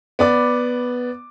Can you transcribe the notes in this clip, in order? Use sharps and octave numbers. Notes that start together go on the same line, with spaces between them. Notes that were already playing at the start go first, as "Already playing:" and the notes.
B3 D5 D6